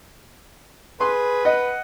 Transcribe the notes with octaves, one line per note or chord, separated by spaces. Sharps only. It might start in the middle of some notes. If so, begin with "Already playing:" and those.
G#4 B4 C6
D#5 F#5